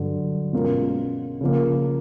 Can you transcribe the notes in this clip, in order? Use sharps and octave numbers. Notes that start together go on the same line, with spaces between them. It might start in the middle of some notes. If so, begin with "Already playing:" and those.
Already playing: G2 D3 F#3
B2 G#3 C#4 F4 A#4
C#3 F3 A#3